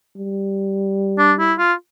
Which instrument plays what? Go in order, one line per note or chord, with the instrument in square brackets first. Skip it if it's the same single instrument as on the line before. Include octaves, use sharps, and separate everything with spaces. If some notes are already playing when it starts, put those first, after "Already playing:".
[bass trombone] G3
[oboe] D4
E4
F4